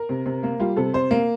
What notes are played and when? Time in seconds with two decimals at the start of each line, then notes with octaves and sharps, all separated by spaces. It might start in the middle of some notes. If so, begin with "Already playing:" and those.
Already playing: A#4
0.09 C3
0.26 C3
0.43 A#3
0.60 G3 F4
0.76 C3 A4
0.94 C3 C5
1.11 A#3